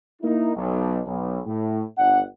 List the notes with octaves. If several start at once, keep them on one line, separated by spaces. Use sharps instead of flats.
A#3 D#4 E4
B1
B1
A2
G1 D4 F#5